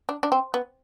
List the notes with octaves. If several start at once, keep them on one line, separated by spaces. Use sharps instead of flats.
D4
D4
C4
B3